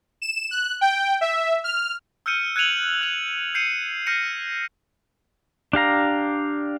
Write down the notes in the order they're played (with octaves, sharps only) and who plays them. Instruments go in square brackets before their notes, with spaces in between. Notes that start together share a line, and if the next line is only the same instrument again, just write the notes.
[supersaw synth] E7
F#6
G5
E5
F6
[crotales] E6 F6 G6 C#7 D#7
F#6 G#6 C#7 D#7 F7 F#7
F#6 F7
G6 C7 C#7 D#7
F6 G6 A#6 C7 C#7 D#7
[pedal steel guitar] D4 G4 F5 A#5